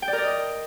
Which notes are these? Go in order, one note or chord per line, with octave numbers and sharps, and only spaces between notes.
G5
D5
A#4
D5
D#5